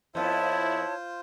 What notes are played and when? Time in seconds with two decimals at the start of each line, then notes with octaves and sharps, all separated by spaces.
0.15 F2 B3 E4 F4 C5 C#5 A5